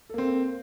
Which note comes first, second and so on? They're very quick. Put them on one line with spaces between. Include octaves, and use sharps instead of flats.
A4 A#3 C4